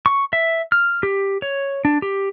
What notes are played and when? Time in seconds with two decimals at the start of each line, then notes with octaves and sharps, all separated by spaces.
0.06 C#6
0.33 E5
0.72 F6
1.03 G4
1.42 C#5
1.85 D4
2.02 G4